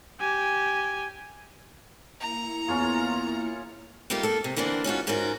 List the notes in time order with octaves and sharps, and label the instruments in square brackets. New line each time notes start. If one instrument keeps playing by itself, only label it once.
[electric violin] G4 G#5
[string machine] A#3 E4 C#7 [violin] A#5
[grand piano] E2 [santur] C#4 F4 G#4
[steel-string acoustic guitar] G3 A3 A#3 D#4 F4 G4
A#3 A4
C3
D3 E3 A#3 C4 D4
C#4 D#4 F4 F#4
G#2 C#4 D#4 F4 F#4 A#4